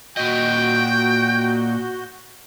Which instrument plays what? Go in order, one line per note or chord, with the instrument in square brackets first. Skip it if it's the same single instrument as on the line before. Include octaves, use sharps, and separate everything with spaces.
[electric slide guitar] A#2 D#5 [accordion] F#4 G6 [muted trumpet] G5